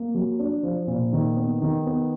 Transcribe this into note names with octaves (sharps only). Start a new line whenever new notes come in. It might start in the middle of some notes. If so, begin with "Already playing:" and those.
Already playing: A#3
F#3
D4
F3
A#2
D#3
B3
D#3
B3